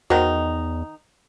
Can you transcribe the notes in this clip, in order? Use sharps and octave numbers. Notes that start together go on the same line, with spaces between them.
E2 D#3 D#4 F#4 C5 F#5